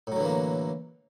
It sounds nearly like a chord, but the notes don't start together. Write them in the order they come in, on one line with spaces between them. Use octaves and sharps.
A2 F#3 D3 E3 A#3